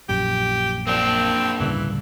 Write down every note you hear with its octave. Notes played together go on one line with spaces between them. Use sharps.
A#1 F#2 G4
A#3 C4 D4
D1 G2 C#3 E3